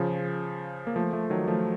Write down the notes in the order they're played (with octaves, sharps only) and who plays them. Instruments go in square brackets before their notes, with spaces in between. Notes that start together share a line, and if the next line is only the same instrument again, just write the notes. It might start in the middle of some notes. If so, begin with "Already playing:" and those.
Already playing: [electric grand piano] C#3 F3
A#3
F3 A3
F3 A3
D#3 F#3
F3 A3